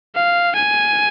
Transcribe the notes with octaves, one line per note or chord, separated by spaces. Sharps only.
F5
G#5